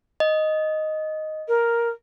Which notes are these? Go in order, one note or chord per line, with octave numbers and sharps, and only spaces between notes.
D#5
A#4